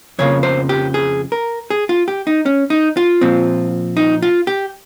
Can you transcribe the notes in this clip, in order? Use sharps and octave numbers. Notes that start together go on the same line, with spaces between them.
F2 C#3 F3 A#3 C#5
C5
G4
G#4
A#4
G#4
F4
G4
D#4
C#4
D#4
F4
A#2 F3 C4
D#4
F4
G4